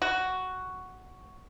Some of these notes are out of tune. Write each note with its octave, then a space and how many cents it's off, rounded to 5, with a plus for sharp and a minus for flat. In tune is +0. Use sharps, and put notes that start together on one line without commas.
F#4 +5